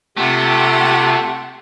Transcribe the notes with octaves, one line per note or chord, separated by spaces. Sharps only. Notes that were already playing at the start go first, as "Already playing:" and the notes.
C3 A3 C4 F4 G4 F#5